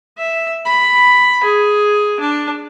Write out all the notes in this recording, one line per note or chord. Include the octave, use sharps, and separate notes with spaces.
E5
B5
G#4
D4